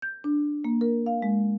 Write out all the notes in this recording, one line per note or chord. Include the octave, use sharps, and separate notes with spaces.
G6
D4
A#3
A#4
F5
G#3